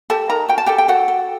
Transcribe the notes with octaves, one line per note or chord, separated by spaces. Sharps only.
G4 A4 A5
D#4 A#4 A#5
F#4 G5
A5
G4 A4 G5
G5
F#4 A4 F#5
A4